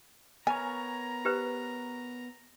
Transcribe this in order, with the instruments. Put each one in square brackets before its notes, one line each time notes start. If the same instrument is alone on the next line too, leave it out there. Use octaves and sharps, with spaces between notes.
[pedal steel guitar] B3 A#4 C#5 [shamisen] G#5 [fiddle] A#5
[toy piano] G4 B4 C5